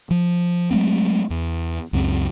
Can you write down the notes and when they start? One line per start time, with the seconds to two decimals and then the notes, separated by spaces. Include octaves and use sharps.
0.11 F3
0.71 F#3 G#3 A3 C4
1.30 E2
1.93 C#2 F#2 C4